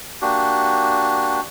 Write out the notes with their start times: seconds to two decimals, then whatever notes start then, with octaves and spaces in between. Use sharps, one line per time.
0.22 A#3 D4 F#4 G4